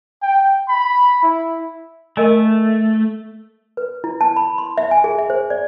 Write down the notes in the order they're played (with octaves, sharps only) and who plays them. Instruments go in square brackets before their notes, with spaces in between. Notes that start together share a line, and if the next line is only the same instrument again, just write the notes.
[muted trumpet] G5
B5
E4
[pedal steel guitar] A3 [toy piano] A#4 D#5 G#5
[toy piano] B4
E4
A5
B5
C6
E5
G#5
G#4
E5
C5
D5